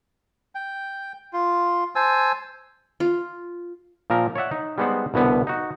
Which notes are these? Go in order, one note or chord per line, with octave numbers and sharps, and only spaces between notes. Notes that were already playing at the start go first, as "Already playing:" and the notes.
G5
F4
C5 G#5 A5 E6
F4
A#2 F3 A#4
C#5 D5 E5 F#5
D#4
G3 G#3 B3 D#4 C5 F#5
C2 B2 D3 B3 C4
D#4 F#4